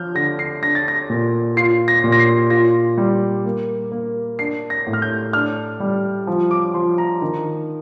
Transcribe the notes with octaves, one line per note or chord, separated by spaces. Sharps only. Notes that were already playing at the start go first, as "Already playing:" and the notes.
Already playing: F3 F6 G6
D3 A#6
C7
D4 A#6
A6
A#6
A#2
F4 C7
A#6
A#2
A#6
C7
F4 A#6
G3
A#3
A#3
D4 C7
A#6
A2
F6
G6
D4 F6
G3
F3
D6
F3 C6
A#5
D#3